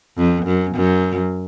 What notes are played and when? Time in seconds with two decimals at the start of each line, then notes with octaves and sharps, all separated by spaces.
0.18 F2
0.46 F#2
0.76 F#2